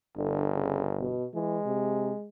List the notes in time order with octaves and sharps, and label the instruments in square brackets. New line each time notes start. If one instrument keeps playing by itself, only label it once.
[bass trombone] G1 [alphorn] D3
[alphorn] C#3
B2
[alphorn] E3 [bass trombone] G#3
[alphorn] C3